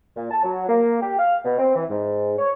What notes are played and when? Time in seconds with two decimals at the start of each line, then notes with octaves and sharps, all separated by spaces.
0.16 A#2
0.30 A5
0.43 F#3
0.69 A#3
1.01 G4
1.19 F5
1.45 B2
1.59 C4
1.75 E3
1.90 G#2
2.39 C#5